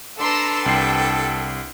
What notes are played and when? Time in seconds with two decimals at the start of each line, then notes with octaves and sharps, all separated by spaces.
0.18 D4 A4 B4 A#5 C6 E6
0.66 C2 G5 C7